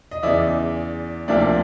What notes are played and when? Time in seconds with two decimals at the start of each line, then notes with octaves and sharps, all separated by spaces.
0.11 D#5
0.23 E2 C#3 E3 D5 E5
1.28 D2 C3 F3 A#3 D4 D5 E5